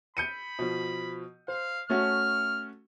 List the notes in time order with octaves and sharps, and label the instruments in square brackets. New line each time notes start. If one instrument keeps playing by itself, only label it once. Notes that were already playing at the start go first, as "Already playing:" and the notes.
[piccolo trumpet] B5 [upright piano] G6 C#7 D#7
[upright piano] B2 F3
[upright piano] C5 [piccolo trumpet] F5
[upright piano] A3 C#4 F#4 [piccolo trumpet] F6